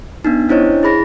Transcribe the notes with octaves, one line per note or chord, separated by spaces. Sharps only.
B3 D4 D#4
C#4 D4 E4 C5 C#5 D#5
E4 G#4 B5 A#6